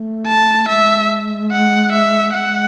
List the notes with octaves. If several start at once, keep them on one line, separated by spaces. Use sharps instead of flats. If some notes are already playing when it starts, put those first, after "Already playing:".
Already playing: A3
A5
G#3 E5
F#5
E5
G#3 F#5